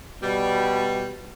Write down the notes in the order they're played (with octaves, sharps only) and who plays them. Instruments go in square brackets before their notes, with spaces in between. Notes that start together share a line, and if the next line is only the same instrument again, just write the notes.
[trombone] B2 [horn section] G3